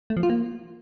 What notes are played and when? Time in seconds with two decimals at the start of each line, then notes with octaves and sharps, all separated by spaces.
0.10 A3
0.17 F3
0.23 F4
0.30 A#3